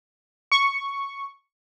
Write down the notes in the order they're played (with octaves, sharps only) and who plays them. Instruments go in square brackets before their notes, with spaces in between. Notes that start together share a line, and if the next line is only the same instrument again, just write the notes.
[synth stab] C#6